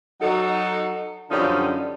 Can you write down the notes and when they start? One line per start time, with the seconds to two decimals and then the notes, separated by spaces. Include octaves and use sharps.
0.21 F#3 D#4 A4
1.30 F#2 D3 F3 G3 C#4 D#4